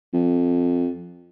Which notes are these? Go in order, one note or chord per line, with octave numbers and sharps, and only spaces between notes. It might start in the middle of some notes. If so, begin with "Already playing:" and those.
F2